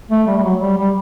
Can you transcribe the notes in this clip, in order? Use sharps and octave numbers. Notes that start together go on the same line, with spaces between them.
A3
G3
G3
F#3
G3
G3